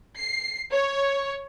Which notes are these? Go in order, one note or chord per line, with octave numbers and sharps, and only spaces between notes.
C7
C#5